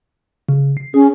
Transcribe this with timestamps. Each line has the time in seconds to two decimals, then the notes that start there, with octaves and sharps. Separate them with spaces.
0.49 C#3
0.77 C7
0.94 C#4 G#4